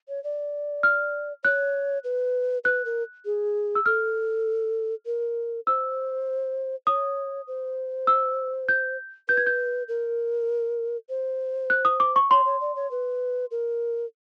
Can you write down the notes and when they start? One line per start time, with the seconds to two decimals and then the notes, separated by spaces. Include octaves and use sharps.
0.08 C#5
0.24 D5
0.83 F6
1.44 C#5 F#6
2.04 B4
2.64 B4 F#6
2.85 A#4
3.25 G#4
3.75 E6
3.86 A4 F6
5.06 A#4
5.67 C5 E6
6.87 C#5 D#6
7.47 C5
8.07 E6
8.69 G6
9.29 B4 G6
9.37 G#6
9.47 G6
9.88 A#4
11.09 C5
11.70 F#6
11.85 D#6
12.00 D6
12.16 C#6
12.30 C#5 C6
12.45 C#5
12.61 D5
12.76 C#5
12.91 B4
13.51 A#4